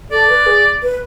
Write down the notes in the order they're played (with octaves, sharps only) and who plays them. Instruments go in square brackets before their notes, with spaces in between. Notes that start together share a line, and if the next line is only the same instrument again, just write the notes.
[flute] A4 [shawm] D5
[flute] B4
G#4
B4